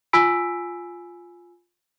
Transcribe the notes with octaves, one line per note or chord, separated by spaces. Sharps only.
F4 G#5 B5 E6 B6 D7